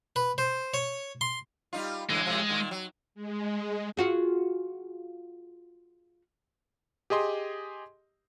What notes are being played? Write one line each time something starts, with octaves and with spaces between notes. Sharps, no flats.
B4
C5
C#5
C6
G3 D#4 F4
A2 D3 E3 G#3
A2 C3 F3
A#2 D#3
F#3
G#3
F4 F#4 G#4
G4 G#4 D#5 C6